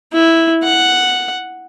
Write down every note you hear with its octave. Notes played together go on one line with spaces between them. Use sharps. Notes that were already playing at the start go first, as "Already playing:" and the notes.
E4
F#5